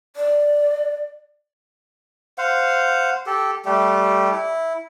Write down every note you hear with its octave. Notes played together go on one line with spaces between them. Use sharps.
D5
C5 F5 F#5
G4 A4
G3 A3 G4
E4